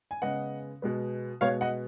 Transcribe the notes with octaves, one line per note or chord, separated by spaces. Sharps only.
G#5
C#3 G#3 B3 D#5 F#5
B2 G#3 B3
B2 G#3 B3 C#5 F5
D#5 F#5